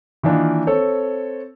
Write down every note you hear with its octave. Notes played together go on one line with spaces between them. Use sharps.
D#3 E3 A#3 D4 D#4 F4
C4 A4 C#5